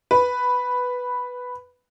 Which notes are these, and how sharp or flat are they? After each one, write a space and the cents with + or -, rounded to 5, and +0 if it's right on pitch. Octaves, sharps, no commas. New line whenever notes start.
B4 +0